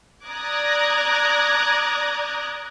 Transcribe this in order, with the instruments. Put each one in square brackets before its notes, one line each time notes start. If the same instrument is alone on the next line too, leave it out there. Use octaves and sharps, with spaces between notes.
[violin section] D5 A#5 D6 D#6 F#6 G#6